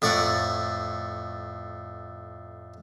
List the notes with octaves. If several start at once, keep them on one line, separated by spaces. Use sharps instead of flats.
F2 A2 D5 F#5 C#6